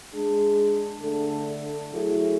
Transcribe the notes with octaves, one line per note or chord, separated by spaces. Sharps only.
G#3 D4 G#4
D3 A3 D4 A4
F#3 A3 E4 G#4